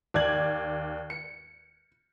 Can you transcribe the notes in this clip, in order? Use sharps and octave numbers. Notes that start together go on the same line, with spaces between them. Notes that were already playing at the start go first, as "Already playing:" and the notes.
D#2 D5 G#6 F#7
C#7